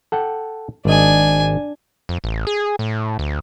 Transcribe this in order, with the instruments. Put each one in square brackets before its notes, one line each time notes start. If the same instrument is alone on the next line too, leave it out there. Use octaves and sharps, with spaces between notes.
[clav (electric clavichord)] A4 F#5 G5
[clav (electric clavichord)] G#1 D#5 [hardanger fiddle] D4 G#5
[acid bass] F2
A1
G#4
A2
D2